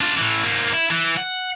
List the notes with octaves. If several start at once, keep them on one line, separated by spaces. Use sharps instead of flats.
D4 F4
A2 E3
G#2 A#3
E4
E3
F#5